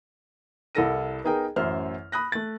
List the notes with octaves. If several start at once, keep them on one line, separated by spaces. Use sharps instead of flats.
C2 E4 A4 A#4 A#6 D#7
B3 D#4 G#4 A#4 G5
A1 F#2 C5 E5 F6
B5 D#6 F#6 A#6
A3 A6